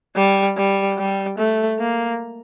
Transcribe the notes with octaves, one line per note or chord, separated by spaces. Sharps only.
G3
G3
G3
A3
A#3